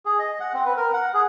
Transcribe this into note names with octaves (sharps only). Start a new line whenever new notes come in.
G#4
D#5
F#5
C4
B4
A#4
F#5
G#4